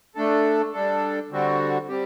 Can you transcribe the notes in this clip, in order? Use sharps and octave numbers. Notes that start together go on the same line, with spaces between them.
A3 D4 A4
G3 D4 A4
D3 G3 C4 F#4
G3 C4 G4